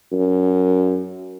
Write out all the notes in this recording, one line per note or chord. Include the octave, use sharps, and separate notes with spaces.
F#2